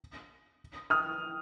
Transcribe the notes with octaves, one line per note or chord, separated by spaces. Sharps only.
D#6 F6